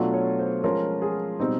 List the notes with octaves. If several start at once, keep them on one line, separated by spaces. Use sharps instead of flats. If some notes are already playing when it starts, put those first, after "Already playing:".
Already playing: B2 F#3 A3 D4 F4
C#5
C5
F3 G#3 C#4 F4 A#4
G#4
B2 G3 C4 D#4